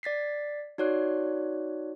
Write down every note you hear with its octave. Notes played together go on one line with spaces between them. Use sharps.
D5 A6 B6 C7
D#4 F#4 C#5 D5 F#6